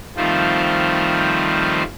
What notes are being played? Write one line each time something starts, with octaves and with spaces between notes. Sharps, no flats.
D#3 F3 G3 A3 C4 F4